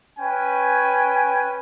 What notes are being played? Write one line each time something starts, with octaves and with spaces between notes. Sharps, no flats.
C#4 B4 G5 G#5